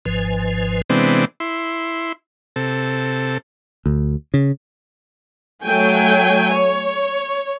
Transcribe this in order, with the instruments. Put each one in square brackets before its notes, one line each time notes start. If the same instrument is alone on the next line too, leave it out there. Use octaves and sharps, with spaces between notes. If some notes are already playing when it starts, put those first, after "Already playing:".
[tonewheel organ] G#1 G#2 F3 B4 G#5
[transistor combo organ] C3 E3 G#3 B3 C4 D4
E4 C6
C3 A4
[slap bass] D2
C#3
[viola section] F#3 A3 G5 G#5
C#5